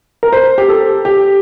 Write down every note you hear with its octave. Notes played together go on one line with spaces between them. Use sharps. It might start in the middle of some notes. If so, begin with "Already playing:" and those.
A#4
C5
G4
A4
G4